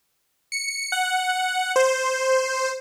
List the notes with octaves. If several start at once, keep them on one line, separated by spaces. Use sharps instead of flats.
C#7
F#5
C5